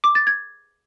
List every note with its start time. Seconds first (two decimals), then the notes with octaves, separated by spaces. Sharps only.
0.04 D6
0.15 A6
0.27 G#6